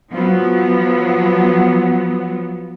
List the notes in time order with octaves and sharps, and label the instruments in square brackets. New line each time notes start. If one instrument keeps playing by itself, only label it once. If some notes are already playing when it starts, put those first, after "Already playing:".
[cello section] F3 F#3 B3